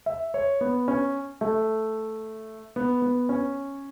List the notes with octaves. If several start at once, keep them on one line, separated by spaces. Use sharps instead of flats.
E5
C#5
B3
C#4
A3
B3
B3
C#4